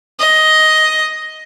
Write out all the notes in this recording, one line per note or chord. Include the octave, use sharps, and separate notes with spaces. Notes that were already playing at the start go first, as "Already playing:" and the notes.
D#5